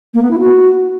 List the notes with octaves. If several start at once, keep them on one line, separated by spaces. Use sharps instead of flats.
A#3
B3
E4
F#4